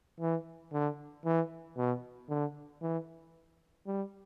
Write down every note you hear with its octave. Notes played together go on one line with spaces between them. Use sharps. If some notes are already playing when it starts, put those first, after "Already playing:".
E3
D3
E3
B2
D3
E3
G3